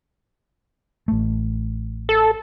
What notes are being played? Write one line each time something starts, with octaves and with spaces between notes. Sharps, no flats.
A1 A3
A4